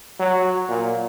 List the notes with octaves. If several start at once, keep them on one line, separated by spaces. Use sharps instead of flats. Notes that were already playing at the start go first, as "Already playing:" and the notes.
F#3
A#2